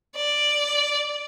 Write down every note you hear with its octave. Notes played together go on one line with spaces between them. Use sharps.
D5